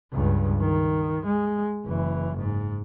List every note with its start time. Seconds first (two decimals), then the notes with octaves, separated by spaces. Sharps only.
0.13 C#2 G2
0.61 D#3
1.26 G#3
1.85 F#1 E3
2.38 G#2